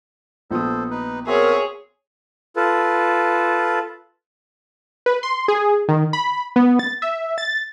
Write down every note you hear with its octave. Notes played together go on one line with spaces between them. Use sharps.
A#1 B3 A4 C5 D#6
D#4 B4
C4 F#4 G#4 A#4 C#5 E5
F4 A4 B4
B4
C6
G#4
D#3
B5
B3
A6
E5
A6